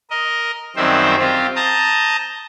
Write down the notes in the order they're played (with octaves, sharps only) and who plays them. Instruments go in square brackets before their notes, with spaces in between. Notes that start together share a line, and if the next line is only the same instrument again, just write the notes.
[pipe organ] A#4 D#5
F#2 D#3 G3 C4 C5 E5
C4 F4 G4
A5 A#5 D#6 G6